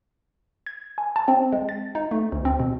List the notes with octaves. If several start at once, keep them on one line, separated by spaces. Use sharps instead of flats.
G#6
G#5
A5
C4
G#3
A6
D#4
A3
D2
C4
B2